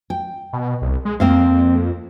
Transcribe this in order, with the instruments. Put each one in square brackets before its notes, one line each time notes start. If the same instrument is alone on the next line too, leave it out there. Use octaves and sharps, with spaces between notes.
[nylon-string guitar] G5
[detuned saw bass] B2
C2
G#3
[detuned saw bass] F2 [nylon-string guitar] A#3 C4 F5